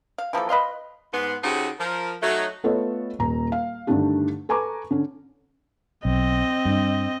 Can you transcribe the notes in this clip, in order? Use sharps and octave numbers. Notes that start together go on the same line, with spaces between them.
F5
E3 F3 A#3 A4
B4 D#5 F5 C6
G#2 B3 C6
C#3 D#4 F#4 G4 A4 C5
F3 A#4
F#3 A3 D#4
A3 B3 F4 A4 C#5 D#5
D#1 A#5
F5
G2 D3 D#3 A3 D4 G4
A4 B4 G#5 A#5 C#6 D6
D3 C#4
B1 C4 D#5
G2